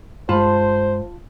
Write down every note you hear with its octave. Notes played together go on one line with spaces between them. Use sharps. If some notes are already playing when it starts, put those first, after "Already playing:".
G2 G#3 F4 C5 A5 B5